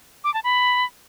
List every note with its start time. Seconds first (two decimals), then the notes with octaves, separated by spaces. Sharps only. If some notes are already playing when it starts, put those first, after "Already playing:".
0.24 D6
0.34 A5
0.44 B5